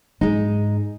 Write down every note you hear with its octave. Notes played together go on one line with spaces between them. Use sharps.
G#2 G#3 D#4